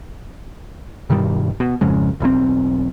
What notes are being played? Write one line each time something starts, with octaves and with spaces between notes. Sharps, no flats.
G2 B2 D#3 G3
B2
G#1 F2 C#3 G#3
E1 B1 A2 C4